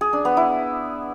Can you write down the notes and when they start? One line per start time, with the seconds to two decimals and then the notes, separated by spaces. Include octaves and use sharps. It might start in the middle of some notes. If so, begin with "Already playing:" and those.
0.01 G#4
0.13 D4
0.25 B3
0.37 E4